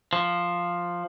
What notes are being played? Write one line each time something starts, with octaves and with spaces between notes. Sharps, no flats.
F3